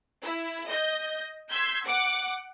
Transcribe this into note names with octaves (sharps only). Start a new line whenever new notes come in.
E4
D#5 G6
C6 E6 G6 G#6 B6
F#5 D6